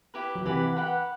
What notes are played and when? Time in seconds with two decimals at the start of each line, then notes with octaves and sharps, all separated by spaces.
0.14 E4 G4 B4
0.35 F#3
0.45 C3 E3 G4 B4 F#5 B5
0.76 G4 B4 F#5 B5